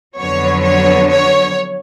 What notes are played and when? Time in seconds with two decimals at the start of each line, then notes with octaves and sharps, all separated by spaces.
0.18 F2 D3 F#3 B3 C#5
0.63 C#5
1.09 C#5